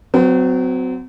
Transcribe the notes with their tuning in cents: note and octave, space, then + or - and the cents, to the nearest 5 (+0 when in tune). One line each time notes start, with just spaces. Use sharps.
F#3 +0 C4 -35